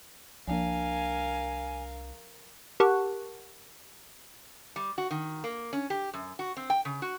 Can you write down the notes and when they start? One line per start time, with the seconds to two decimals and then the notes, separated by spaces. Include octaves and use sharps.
0.47 C2 F3 A#3 D4 A#4 F5 G#5
2.80 G4 A#4 F#5 A5 C#6 F#6
4.76 G3
4.98 F#4
5.11 D#3
5.44 A#3
5.73 C#4
5.90 G4
6.13 F#2
6.39 F#4
6.57 C4
6.70 G5
6.85 C#3
7.02 F#4